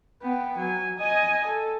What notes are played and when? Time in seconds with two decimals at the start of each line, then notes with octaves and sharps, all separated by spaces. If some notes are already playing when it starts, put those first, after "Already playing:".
0.22 B3 G5
0.58 F#3 G#5
0.98 D#5 G#5
1.46 A4